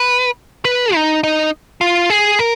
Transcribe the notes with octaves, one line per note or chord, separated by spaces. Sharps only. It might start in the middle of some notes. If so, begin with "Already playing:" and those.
Already playing: B4
B4
D#4
D#4
F4
G#4
A#4